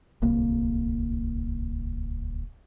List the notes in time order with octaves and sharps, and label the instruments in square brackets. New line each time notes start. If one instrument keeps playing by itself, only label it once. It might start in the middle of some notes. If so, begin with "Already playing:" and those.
[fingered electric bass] D1 C2 A#3